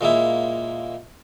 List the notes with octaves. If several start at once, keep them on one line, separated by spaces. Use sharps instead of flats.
A#2 G#3 A#3 E4